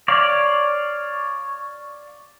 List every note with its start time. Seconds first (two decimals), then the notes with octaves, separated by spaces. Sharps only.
0.08 C#5 D5 F5